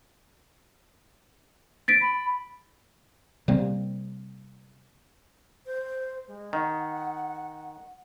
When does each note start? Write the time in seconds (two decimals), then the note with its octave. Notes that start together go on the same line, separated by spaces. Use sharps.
1.88 A6 B6 D7
2.01 B5
3.48 C3 G3 A#3 C4
5.66 C5
6.28 G#3
6.53 D#3 F#5